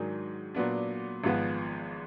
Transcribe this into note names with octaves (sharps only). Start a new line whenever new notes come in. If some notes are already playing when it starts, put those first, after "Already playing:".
Already playing: G#2 D#3 F#3 D4 G#4
A#2 F#3 B3 D4
G#1 G#2 F3 B3